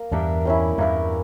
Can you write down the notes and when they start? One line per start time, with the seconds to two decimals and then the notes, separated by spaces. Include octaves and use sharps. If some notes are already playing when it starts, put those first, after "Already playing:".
Already playing: A#3
0.12 E2 G2 D4 G4 A#4 E5
0.45 G3 C#4 E4
0.78 E2 G2 A#3 E4 A#4